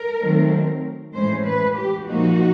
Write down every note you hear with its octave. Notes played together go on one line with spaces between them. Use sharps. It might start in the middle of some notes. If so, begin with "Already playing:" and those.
Already playing: A#4
D#3 F#3 A3 C4
A2 E3 G#3 C#4 C5
B4
G4
A#2 F3 A#3 D#4 F#4